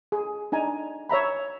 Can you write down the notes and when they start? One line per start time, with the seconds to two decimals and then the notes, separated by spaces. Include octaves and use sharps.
0.12 G#4
0.52 D4 D#4 G#5 A#5
1.09 C#5 E5 A#5 B5